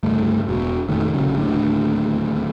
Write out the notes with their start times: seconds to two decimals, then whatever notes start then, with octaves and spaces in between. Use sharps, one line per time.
0.03 G1 C#2 G2 A3
0.46 E1 B2
0.88 F1 A#2 D#3 A3
1.14 A#1 C#3 F#3 C#4
1.37 D1 D#2 A2 D4